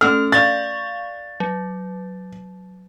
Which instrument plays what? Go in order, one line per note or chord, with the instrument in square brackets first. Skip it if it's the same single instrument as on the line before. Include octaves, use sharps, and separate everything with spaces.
[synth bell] A3 C#4 A4 [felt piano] F6
[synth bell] D5 F5 C#6 [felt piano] A6
[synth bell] F#3